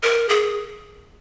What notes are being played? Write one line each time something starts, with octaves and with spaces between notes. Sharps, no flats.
A#4
G#4